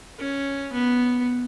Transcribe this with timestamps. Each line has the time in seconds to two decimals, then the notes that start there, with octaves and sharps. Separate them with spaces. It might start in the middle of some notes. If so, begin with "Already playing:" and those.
0.19 C#4
0.73 B3